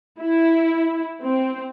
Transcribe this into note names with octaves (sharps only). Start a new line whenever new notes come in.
E4
C4